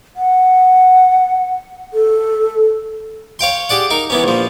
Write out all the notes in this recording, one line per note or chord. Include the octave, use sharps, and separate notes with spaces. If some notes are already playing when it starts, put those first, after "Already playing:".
F#5
A4
C#5 F5 G5 C6
G4 G#4 D5 F#5
D#4 A#4
E3 B3 C#4
A#1 F3